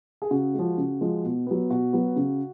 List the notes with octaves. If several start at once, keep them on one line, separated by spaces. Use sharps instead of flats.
G#4
C#3 F#4
F3 G#3
C#3
F3 G#3
B2
F#3 B3
B2 F#4
F#3 B3
C#3